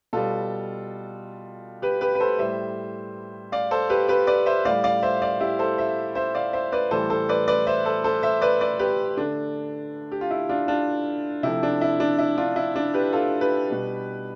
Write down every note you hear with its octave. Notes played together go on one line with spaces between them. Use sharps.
B2 G3 F4 A4
G4 B4
G4 B4
B4
A4 C5
A2 G3 C5 E5
D5 F5
A4 C5
G4 B4
G4 B4
B4 D5
C5 E5
A2 G3 D5 F5
D5 F5
C5 E5
D5 F5
E4 G4
A4 C5
C5 E5
C5 E5
D5 F5
C5 E5
B4 D5
A2 E3 G3 A4 C5
A4 C5
B4 D5
B4 D5
C5 E5
A4 C5
A4 C5
C5 E5
B4 D5
B4 D5
G4 B4
D3 A3 D4
G4
F4
E4
D4 F4
D4 F4
C3 F3 A3 E4
D4
E4
D4
E4
D4 F4
E4
D4
G4 B4
F4 A4
G4 B4
B2 G3